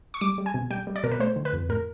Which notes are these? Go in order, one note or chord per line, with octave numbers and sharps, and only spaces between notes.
C#6
G3 D6
G3
G#5
B2
G3 G5
G3
D5
B2 A#4
B4
A3 C5
D3
B4
F2
A2 A#4